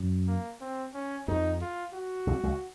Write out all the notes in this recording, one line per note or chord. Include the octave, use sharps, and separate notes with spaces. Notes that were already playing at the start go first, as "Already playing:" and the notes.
Already playing: F#2
A#3
C4
C#4
F2 D#4
F4
F#4
C2 C3
C#2 C#3